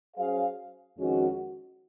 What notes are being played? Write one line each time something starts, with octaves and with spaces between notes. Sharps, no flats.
F#3 C#4 G#4 C5 F5
F2 D#3 G#3 C#4 F#4